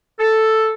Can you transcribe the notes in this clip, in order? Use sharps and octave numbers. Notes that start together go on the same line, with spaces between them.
A4